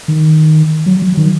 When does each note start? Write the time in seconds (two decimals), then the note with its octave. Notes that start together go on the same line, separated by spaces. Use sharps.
0.08 D#3
0.86 F#3
1.02 F#3
1.17 D#3